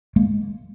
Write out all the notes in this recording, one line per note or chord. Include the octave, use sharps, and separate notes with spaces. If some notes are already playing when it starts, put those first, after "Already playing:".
G#3 A#3